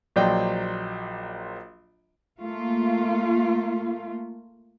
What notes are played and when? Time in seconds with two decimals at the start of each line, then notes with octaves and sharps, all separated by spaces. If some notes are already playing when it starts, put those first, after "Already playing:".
0.16 A#1 F#3 C5 D5 D#5 G5
2.39 A3 A#3 F4